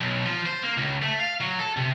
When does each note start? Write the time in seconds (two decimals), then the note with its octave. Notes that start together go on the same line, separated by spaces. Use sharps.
0.01 B1
0.26 F3
0.46 C5
0.63 A#3
0.77 C#2
1.02 A3
1.20 F5
1.41 F#3
1.59 A4
1.77 C3